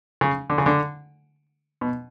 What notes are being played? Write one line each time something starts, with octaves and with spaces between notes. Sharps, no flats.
C#3
D3
C#3
D3
B2